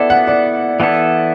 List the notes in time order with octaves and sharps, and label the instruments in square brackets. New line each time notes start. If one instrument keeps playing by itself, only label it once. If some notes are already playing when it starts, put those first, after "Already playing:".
Already playing: [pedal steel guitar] B3 E4 A4 [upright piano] D5
[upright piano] F#5
D5
[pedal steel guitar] E3 B3 E4 A4 [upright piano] D5